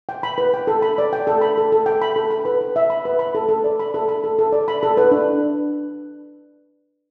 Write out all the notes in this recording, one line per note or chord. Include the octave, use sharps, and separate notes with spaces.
G5
B5
B4
G5
A4
B5
D5
G5
A4
B5
A4
A4
G5
B5
A4
B5
B4
B4
E5
B5
B4
B5
A4
A4
D5
B5
A4
B5
A4
A4
D5
B5
A4
B4
D4